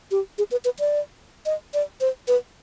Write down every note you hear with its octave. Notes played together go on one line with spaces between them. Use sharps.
G4
G#4
B4
B4
D5
D#5
D5
C5
B4